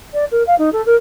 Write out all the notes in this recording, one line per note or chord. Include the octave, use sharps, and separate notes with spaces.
D5
A#4
F5
D#4
A4
A#4